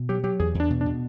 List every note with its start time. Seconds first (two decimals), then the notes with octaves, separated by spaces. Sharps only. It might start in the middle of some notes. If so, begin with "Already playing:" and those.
Already playing: B2
0.09 F#3 G4
0.24 F#3 G4
0.39 E2 G#4
0.55 E2
0.60 D4
0.70 B2
0.81 D4
0.86 B2